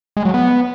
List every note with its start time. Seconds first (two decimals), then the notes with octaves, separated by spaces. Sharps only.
0.17 G#3
0.25 F#3
0.34 B3